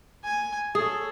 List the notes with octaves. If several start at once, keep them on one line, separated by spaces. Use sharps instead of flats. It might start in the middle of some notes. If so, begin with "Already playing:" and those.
G#5
G#4 A4 C#5